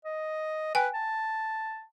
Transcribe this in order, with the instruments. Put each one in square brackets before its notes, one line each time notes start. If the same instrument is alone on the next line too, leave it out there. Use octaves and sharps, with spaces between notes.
[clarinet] D#5
[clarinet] B4 [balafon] G5 G#5
[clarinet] A5